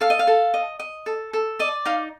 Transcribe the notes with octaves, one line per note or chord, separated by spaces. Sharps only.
A4 F5
D#5
F5
A4
D#5
D#5
A4
A4
D5 D#5
D#4 F5